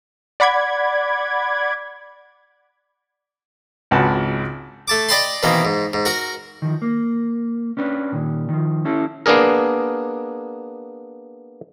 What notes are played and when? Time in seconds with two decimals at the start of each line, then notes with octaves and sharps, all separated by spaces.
0.40 D5 F#5 B5 D6 G#6
3.91 G#1 C#2 F#4 B4 A5
4.88 A3 A5 D6
5.09 D5 D#5 G5 A5 B5 C6
5.43 B2 D#3 E3 A#3 C4
5.65 G#2
5.93 G#2
6.05 F#4 A#4 A#5
6.62 D#3 F3
6.82 A#3
7.77 C#4 D4 B4
8.12 A#2 D#3
8.49 D#3 F3
8.85 C#4 E4 A4
9.26 A#3 B3 D4 G#4 A#4